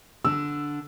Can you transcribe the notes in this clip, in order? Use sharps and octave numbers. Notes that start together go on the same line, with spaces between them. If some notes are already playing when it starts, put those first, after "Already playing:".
D3 E6